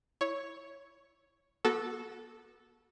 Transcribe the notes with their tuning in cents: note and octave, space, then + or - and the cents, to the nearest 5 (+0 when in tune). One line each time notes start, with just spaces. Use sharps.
E4 +0 C#5 +0
B3 -40 F#4 +0 A4 -10